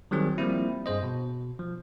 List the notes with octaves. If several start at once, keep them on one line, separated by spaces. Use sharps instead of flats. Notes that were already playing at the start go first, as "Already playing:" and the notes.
D#3 F#3 G3 C4 G#4
F3 G3 A#3 C4 E4
G2 G#4 C5 D#5
B2
F3